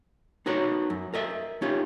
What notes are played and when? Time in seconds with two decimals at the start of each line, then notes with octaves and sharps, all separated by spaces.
0.46 D#4 F#4 A#4 B4 C#5
0.90 F#2
1.14 A#4 D#5 E5
1.62 C#4 D#4 F4 G4